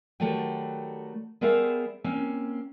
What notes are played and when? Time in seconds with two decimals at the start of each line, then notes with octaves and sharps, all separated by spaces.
0.20 D#3 F#3 G3 A3 F#4 G5
1.41 G3 B3 G#4 A#4 C5 E5
2.04 A#3 C4 C#4